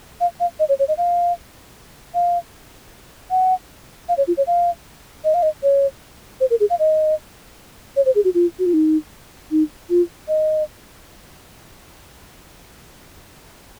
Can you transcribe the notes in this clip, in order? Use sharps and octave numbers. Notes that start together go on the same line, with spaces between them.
F5
F5
D#5
C#5
C#5
D#5
F5
F5
F#5
F5
C#5
F4
C#5
F5
D#5
F5
D#5
C#5
C5
A#4
G#4
F5
D#5
C#5
C5
G#4
F#4
F4
F#4
F4
D#4
D#4
F4
D#5